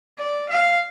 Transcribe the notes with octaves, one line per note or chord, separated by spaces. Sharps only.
D5
F5